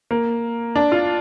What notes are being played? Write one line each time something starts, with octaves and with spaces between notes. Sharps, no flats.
A#3
D4
F4